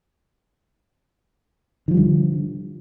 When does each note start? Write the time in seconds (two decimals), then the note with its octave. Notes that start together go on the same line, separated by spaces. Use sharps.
1.88 D#3
1.91 F3
1.94 G3
1.97 D3